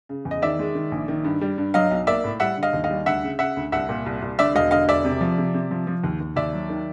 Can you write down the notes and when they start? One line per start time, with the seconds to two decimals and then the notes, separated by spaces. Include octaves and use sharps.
0.09 C#3
0.25 E2
0.31 D#5
0.42 D#3 D5 E5
0.59 G#3
0.75 D#3
0.92 A#1
1.08 D#3
1.24 G2
1.41 G3
1.58 G2
1.74 F#3 D#5 F5
1.91 B1
2.07 A#3 D5 E5
2.24 A2
2.40 G3 E5 F#5
2.57 D3
2.63 D#5 F5
2.73 D#2
2.84 D#5 F5
2.90 G3
3.06 D2 E5 F#5
3.23 C#3
3.39 C#3 E5 F#5
3.57 D2
3.72 C2 E5 F#5
3.89 A#2
4.06 C2
4.22 C2
4.39 D3 D5 E5
4.55 E1 D#5 F5
4.71 D3 D#5 F5
4.88 E1 D5 E5
5.05 C3
5.21 F3
5.38 C3
5.54 C3
5.71 F3
5.87 F3
6.04 D#2
6.20 D#2
6.36 D#2 D5 E5
6.53 F#3
6.69 D#3